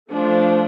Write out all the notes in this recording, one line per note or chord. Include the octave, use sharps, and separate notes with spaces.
F3 A3 D4